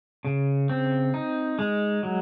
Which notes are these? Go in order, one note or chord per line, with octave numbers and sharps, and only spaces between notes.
C#3
C4
D#4
G#3
F#3